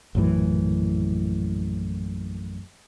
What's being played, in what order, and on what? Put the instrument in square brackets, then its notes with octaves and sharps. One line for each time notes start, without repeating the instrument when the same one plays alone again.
[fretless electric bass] A#1 F#2 A2 E3